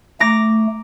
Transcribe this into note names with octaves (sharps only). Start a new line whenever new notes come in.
A3 A#5 D6 A#6